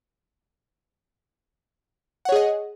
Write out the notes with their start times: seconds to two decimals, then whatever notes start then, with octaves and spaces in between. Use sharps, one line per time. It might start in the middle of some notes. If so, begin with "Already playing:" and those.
2.25 F#5
2.29 C#5
2.32 G#4
2.36 D#5